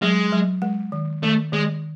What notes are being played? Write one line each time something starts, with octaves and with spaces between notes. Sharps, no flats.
F#3 G#3
F#3
G#3
D#3
D#3 A3
D#3 G#3